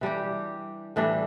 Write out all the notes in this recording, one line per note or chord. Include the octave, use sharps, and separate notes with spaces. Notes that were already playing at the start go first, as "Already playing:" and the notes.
E3 G3 D4 G4
A2 E3 G3 D4